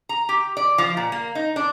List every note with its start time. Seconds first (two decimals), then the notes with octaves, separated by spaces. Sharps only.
0.09 A#5
0.29 G4
0.57 D5
0.78 F3
0.97 A#2
1.12 A#3
1.35 D#4
1.56 D4